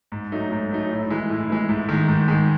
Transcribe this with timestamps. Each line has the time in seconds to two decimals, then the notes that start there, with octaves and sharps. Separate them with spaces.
0.12 G#2
0.32 F#3 A3 D#4
0.52 G#2
0.71 F#3 A3 D#4
0.91 A2
1.10 E3 G#3
1.30 A2
1.50 E3 G#3
1.69 G#2
1.89 D#3 G#3
2.08 G#2
2.28 D#3 G#3